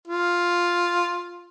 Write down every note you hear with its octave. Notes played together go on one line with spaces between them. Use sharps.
F4